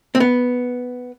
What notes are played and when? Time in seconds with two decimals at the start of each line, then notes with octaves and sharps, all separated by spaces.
0.15 C4
0.20 B3